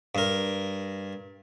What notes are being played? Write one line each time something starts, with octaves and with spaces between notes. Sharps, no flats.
G2 A#4